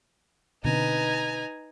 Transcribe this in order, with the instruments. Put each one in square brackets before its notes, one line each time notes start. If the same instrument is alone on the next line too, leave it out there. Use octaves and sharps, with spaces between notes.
[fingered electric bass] B2 D3 C4 [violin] D#4 B4 [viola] G#5 A#5